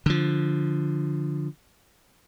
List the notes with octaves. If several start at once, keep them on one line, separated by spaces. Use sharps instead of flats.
D3 F3